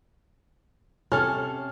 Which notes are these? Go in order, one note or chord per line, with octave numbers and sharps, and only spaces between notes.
C3 C#4 A4 F6